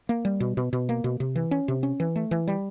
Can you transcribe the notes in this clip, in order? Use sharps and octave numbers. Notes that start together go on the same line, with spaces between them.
A#3
G3
B2
B2
B2
A#3
B2
C3
E3
C#4
C3
C#4
E3
A3
E3
G3